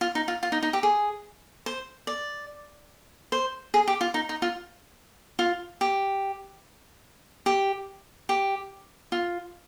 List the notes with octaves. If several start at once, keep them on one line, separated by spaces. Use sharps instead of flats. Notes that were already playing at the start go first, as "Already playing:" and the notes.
F4
D#4
F4
F4
D#4
D#4
G4
G#4
C5
D5
C5
G#4
G4
F4
D#4
D#4
F4
F4
G4
G4
G4
F4